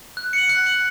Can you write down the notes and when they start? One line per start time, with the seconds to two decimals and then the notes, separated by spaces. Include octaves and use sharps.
0.17 F#6
0.33 C#7 F#7
0.49 F#6
0.66 C#7 F#7